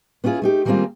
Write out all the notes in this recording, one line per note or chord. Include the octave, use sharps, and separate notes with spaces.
B3 C#4 E4 F4 G#4
A3 D#4 G4
D#3 G3 G#3 A#3 C4 F4